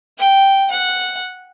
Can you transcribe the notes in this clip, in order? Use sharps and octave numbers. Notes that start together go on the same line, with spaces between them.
G5
F#5